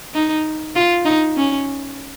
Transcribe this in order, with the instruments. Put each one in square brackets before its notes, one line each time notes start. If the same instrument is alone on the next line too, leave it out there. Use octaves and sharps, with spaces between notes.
[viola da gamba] D#4
F4
D#4
C#4